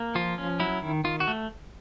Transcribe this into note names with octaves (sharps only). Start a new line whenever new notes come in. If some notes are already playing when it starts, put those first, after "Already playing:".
Already playing: A#3
F3 F4
C#4
F#3 E4
D#3
D#3 F4
F#4
A3